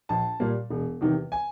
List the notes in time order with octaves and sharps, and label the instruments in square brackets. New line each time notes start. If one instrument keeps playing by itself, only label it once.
[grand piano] A#1 A5
A#2 G3 A#3
E1
E2 C3 D#3
G#5